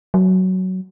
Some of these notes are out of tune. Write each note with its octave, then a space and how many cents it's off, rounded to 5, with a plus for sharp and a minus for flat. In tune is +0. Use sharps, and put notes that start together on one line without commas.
F#3 +10